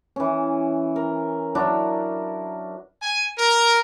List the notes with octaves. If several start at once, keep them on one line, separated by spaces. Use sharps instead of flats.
E3 C#4
A#4
F#3 D4 E4 A#4
G#5
A#4